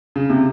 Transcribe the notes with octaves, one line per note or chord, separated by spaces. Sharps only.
C#3
C3